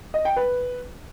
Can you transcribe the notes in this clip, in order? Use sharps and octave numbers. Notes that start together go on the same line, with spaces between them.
D#5
G5
B4